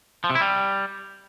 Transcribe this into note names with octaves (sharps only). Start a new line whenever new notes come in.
F3
C3
E4
G3